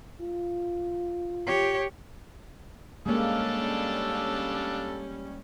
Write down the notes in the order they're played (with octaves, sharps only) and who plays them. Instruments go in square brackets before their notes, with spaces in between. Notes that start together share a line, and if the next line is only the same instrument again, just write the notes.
[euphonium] F4
[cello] G4 C#5
[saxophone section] G3 C#4 [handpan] G#3 A#3 [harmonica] D4 A4 F5